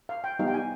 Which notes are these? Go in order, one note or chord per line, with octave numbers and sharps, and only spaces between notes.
F5
G5
G3 B3 D#4 G4 F5
G5
G#5